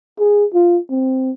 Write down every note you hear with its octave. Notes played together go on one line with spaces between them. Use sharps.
G#4
F4
C4